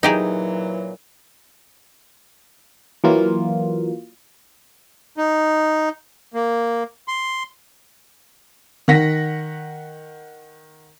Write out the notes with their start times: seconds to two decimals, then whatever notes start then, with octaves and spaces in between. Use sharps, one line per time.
0.03 A#2 E3 F#3 D#4 G4 G#4
3.04 E3 F#3 A#3 F4
5.17 D#4
6.34 A#3
7.08 C6
8.88 D#3 F#5 A#6 B6